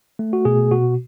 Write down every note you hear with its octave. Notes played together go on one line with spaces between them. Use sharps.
A3
F#4
B2 G#4
B2 F#4